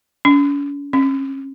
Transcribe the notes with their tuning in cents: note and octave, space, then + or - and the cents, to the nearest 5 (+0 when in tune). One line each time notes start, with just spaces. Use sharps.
C#4 +40
C#4 -35